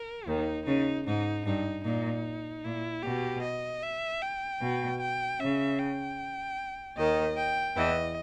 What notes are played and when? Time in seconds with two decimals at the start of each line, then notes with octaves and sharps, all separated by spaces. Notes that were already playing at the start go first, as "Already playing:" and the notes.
Already playing: A#4
0.27 D#2 D#3 D#4
0.66 C#3 D#4
1.06 G#2 D#4
1.45 G2 D#4
1.85 A#2 D#4
2.64 A#2 E4
3.03 B2 G4
3.42 D#5
3.83 E5
4.22 G5
4.61 B2
5.01 G5
5.40 C#3 E5
5.79 G5
6.97 D#2 D#3 D#5
7.37 G5
7.76 E2 E3 D#5